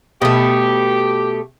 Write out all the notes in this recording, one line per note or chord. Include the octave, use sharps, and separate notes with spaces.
B2 A3 G4